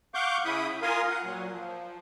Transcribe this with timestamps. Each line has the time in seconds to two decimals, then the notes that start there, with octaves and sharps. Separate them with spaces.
0.14 F5 F#5 C#6 D6 G6
0.45 C#3 E4 B5 D#6
0.82 F4 A#4 F5 G#5 C6 D#6
1.10 F#5
1.24 A#2 F#3
1.52 F3